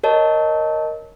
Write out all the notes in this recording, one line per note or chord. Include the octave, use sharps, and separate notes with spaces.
A#4 C#5 D#5 A5